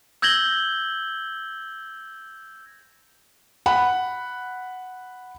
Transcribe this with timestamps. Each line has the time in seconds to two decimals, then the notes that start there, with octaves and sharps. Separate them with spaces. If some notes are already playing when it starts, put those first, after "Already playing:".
0.22 E6 G6 G#6 A#6 F#7 G7
3.66 F#5 B5